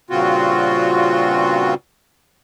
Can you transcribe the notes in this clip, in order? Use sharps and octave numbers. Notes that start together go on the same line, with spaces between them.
G2 A#2 C#3 C4 F4 F#4